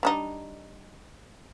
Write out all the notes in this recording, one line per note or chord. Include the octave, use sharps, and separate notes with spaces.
G3 D4 D#4